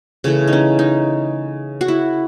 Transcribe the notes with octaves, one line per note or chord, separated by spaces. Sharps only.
C#3 E3 A3 C#4
D#4
C#4
D#4
F#4
E4